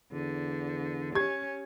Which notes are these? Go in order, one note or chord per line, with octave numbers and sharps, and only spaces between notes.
E2 D3
C#4 G4 G#6